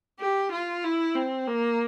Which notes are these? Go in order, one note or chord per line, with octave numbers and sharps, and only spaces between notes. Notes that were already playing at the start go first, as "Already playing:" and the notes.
G4
F4
E4
C4
A#3